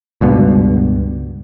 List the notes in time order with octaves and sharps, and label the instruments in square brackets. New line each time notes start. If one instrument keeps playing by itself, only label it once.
[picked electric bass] C#2 G2 B2